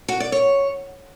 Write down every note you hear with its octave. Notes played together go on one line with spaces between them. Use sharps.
F#4
D5
C#5